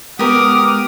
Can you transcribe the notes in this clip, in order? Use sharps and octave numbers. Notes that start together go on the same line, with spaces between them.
G#3 B3 G4 A#4 F#5 D6 D#6 F6